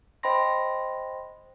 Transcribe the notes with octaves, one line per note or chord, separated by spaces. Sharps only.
C5 D#5 G5 B5 C6 A#6